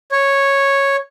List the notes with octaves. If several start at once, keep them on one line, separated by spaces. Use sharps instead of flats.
C#5